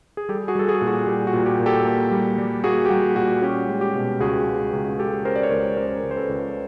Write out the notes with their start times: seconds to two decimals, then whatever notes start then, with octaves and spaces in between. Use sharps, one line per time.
0.17 G#4
0.29 G3 G4 A4
0.48 F#4 G#4
0.55 G3 A4
0.68 F#4 G#4
0.82 A#2
0.87 F#4 G#4
1.07 G3 G4
1.27 F#4
1.33 A#2
1.46 G4
1.60 A#2
1.66 G4 A4
1.85 A#3
2.11 G3
2.38 G3
2.64 A#3 F#4 G#4
2.86 G4
2.90 G3 F#4
3.16 A#2 F#4
3.42 C#4 G4
3.69 G#3
3.81 G4
3.95 B2
4.20 C#2 F#4 G#4
4.47 G#3
4.73 C#2
4.99 G#3 G4 A4
5.25 C#4 A#4 C5
5.36 D5
5.43 C#5
5.51 C#2 A#4 C5
5.77 C#4 A#4 C5
6.03 C#2
6.11 C5
6.16 A4 B4
6.29 C#2